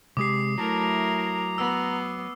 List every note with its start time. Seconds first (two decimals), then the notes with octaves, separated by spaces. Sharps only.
0.17 C3 G#3 G4 D6 D#6 C7
0.58 F#3 A3 E4 A#4 A5 A#5
1.58 B3 E6